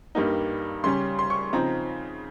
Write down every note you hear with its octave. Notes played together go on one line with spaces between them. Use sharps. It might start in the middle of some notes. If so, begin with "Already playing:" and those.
G2 G3 A#3 D#4
C#3 G3 C#4 C6
C6
C#6
C#3 F3 C4 D#4 A#5